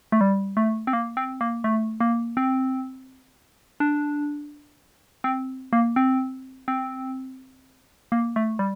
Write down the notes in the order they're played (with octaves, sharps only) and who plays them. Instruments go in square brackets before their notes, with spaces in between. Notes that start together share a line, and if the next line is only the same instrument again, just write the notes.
[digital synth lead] A3
G3
A3
C4
A#3
C4
A#3
A3
A#3
C4
D4
C4
A#3
C4
C4
A#3
A3
G3